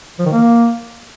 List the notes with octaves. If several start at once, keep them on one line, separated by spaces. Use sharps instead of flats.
F3
D#3
A#3